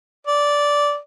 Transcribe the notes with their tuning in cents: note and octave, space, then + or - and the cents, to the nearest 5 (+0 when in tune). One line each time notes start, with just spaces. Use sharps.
D5 -10